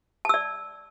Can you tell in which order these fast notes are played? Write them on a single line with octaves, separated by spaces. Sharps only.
A5 E6 D5